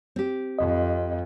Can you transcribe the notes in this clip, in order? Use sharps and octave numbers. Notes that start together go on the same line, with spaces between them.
C4 G4
F2 D#5